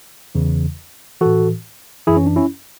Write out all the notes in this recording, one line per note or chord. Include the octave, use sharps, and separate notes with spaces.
E2 C#3 E3
A2 E3 F#4 A4
F#2 E3 E4 G#4
C#4
D4
C#4 E4